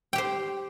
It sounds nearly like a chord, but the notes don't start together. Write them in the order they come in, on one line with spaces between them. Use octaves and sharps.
G5 G4 C5